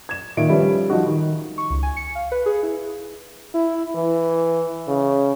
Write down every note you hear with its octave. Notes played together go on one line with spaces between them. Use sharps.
G#6 E7
A#2 D#3 E5 D7
F3 G3 C#4 B4 E5
F3 G3 D#4 F#4
D#3
C#6
C#2
G#5
C#7
F5
B4
G#4
E4
E4
E3
C#3